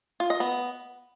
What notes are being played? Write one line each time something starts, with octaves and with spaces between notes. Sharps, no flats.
F4
D#5
B3